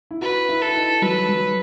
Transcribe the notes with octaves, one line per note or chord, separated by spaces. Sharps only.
E4
F#4 B4
E4
A4
D#4
F#3 B4
F#3